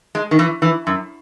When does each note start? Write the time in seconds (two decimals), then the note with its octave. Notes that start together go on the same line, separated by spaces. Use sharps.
0.15 G#3
0.31 D#3
0.39 E3
0.62 E3
0.87 F#2